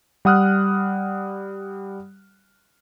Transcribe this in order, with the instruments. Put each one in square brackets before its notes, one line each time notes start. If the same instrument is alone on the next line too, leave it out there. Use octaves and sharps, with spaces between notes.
[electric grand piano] G3 F#5 D#6 F6 F#6